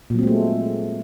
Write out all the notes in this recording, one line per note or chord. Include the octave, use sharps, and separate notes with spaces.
A#2 F#3 G#3 A3 C4